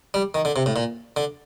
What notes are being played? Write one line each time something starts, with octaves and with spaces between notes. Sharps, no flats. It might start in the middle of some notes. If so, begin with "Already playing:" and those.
G3
D#3
D3
C3
A2
A#2
D3